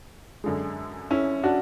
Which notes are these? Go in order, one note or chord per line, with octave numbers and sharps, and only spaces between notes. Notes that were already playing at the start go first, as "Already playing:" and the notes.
F#2 D3 G#3
C#4 E4
D4 F#4